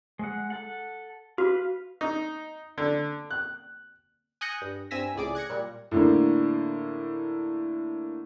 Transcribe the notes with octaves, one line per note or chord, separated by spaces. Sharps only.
G#3 F#5
A4 F#5
F#4 B4 F5
D#4
D3
F#6
G#5 D#6 F#6 G6 A#6 C#7
G2
G2 C4 G#5 E6 A#6 B6
C#2 A2 G#4 D5 D6
F#6 G#6 A#6 C#7
A#2 G3
A2 D3 A#3